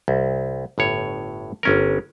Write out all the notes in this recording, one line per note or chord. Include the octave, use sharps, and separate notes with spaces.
C2
G1 A2 C#5
G1 C#4 A#4